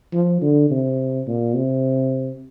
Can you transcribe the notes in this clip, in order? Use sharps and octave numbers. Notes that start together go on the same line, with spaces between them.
F3
D3
C3
A#2
C3